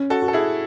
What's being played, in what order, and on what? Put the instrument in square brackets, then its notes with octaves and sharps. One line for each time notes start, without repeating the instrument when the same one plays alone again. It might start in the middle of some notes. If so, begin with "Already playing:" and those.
Already playing: [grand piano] C#4
[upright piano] F#4 A4
[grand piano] F#4
[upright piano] A4
E4 G#4